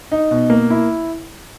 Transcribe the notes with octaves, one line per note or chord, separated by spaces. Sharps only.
D#4
B2
A#3
E4